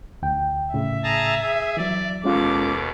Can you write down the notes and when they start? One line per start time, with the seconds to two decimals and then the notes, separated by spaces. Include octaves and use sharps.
0.23 D2 G5
0.74 A2 C#3 E5
1.04 G#4 A5 A#5
1.41 G#4
1.77 E3 F#3 D5
2.24 D#2 B2 G#3 C#4 F4 A4 D6